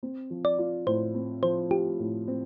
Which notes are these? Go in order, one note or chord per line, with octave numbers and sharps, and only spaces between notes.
C4
F3
D5
F4
A2 C5
C4
F3 C5
F4 G4
A2
C4